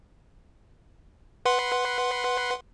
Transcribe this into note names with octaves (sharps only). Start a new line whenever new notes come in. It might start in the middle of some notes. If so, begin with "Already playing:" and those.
B4 F#5 C6